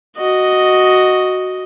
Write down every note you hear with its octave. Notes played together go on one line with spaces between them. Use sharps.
F#4 D#5